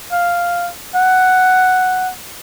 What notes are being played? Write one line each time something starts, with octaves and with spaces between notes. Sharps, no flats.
F5
F#5